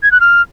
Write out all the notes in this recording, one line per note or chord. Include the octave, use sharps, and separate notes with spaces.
G#6
F#6
F6